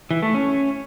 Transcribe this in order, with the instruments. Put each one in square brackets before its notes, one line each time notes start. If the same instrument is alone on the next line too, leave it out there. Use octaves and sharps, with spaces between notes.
[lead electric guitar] E3
A3
C#4